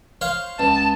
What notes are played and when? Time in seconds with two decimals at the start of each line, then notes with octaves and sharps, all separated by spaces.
0.21 C5 C#5 F5
0.59 C#2 A5